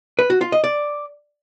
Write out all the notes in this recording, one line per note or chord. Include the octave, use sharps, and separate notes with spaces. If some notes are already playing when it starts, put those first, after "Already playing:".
B4
F#4
F4
D#5
D5